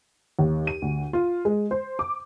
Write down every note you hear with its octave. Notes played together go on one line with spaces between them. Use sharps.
D#2
D#7
D2
F4
G#3
C5
D6